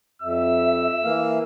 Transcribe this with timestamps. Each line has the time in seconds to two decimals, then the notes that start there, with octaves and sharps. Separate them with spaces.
0.22 F2 E5 E6
1.04 E3 A#3 F5